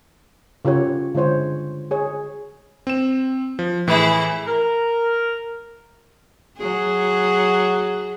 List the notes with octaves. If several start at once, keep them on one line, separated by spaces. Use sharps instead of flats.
C#3 F4 G4 C#5
D3 G#3 F4 C5 C#5
G#4 C#5
C4 E7
F3
A2 E3 E4 G#4
A#4
F#3 G#4